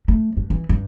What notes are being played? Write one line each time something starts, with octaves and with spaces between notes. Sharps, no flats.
A3
G2
E3
G2